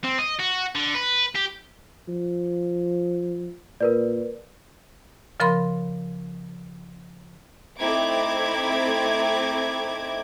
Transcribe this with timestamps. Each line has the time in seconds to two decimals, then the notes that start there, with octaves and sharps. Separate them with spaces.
0.04 C4
0.19 D#5
0.40 F#4
0.75 D3
0.95 B4
1.35 G4
2.08 F3
3.81 A#2 A#4 B4 D5
5.40 C#3 F3 A#4 B5 C6
7.79 A3 C4 D#4 E4 D6 G#6